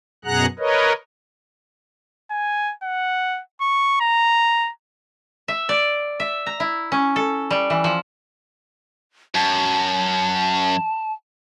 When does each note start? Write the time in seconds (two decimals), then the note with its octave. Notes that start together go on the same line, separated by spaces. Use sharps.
0.25 F#2 B2 G#4 F#5 A#5 F#6
0.59 A#4 B4 C#5 D#5
2.31 G#5
2.83 F#5
3.61 C#6
4.00 A#5
5.48 E5
5.69 D5
6.20 E5
6.46 A#5
6.60 E4
6.92 C#4
7.16 A4
7.51 G3
7.70 E3
7.84 F3
9.35 F#2 A5